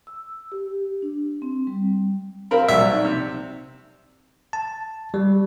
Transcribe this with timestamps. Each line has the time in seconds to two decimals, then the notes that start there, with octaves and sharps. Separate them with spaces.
0.07 E6
0.52 G4
1.02 D4
1.42 C4
1.67 G3
2.51 C4 A#4 F5 B5
2.68 C2 B2 F#3 D5 E5
2.92 D#4
3.04 C3
4.53 A5
5.14 G3